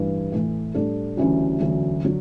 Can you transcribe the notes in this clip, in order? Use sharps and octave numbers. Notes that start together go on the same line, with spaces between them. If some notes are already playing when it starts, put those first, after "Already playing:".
Already playing: A1 G2 E3 G3 D4
A2 E3 A3
A2 G3 D4 A4
D2 C#3 E3 G3 C#4
E1 D2 D3 F#3 C#4
D3 F#3